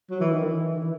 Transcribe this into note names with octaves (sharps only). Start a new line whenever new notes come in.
F#3
E3
D#3
E3
D#3
E3